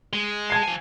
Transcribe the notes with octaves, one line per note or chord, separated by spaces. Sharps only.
G#3
A5 G#6 C7
F3 G#5